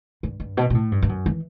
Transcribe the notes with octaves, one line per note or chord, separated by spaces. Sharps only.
G2
G2
B2
B2
A2
G2
G2
F#2
E3